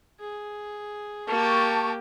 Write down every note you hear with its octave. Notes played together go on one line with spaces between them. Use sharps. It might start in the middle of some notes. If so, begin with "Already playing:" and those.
G#4
A#3 G4 A5 C#6